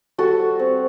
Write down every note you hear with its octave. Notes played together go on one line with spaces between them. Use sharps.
G3 F#4 A4
G3
C4